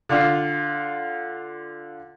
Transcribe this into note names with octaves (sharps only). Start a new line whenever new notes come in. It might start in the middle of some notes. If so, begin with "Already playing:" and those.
D3 F4 D5 F5